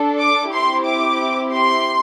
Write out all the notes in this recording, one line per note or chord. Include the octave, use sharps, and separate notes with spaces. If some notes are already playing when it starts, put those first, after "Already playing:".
Already playing: D4 A4
D6
C4 E4 G4 C6
D6
C6